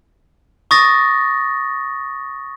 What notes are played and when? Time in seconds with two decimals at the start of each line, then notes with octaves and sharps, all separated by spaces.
0.71 C#6 D#6 A6 A#6